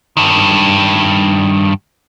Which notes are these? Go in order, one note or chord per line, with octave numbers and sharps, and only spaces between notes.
G2 D#3